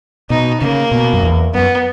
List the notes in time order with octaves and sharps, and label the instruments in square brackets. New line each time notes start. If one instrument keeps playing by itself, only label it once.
[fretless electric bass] B2 [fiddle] D#4
[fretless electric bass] C#3 [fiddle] A#3
[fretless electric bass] B2
F#2
E2
[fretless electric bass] F#2 [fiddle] B3